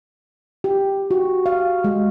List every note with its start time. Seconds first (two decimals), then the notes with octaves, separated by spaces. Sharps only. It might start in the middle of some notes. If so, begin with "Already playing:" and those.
0.64 G4
1.11 F#4
1.46 F5
1.84 G#3